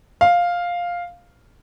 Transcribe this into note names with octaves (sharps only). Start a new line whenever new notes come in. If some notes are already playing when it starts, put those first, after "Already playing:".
F5